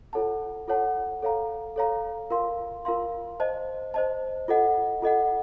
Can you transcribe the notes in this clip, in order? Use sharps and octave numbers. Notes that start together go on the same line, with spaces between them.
F4 A4 C#5 F#5 A5
F4 A4 C#5 F#5 A5
A4 C#5 F5 A#5
A4 C#5 F5 A#5
F4 A#4 F5 C6
F4 A#4 F5 C6
C5 D#5 A5
C5 D#5 A5
F4 A4 D#5 F#5
F4 A4 D#5 F#5